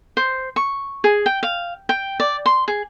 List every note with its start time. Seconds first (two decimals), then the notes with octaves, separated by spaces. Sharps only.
0.17 C5
0.56 C#6
1.04 G#4
1.26 G5
1.43 F5
1.89 G5
2.20 D5
2.46 C6
2.68 G#4